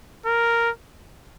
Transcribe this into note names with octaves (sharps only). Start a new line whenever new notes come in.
A#4